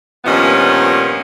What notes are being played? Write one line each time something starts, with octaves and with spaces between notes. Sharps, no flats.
G2 A#2 D#3 F3 B3 C#4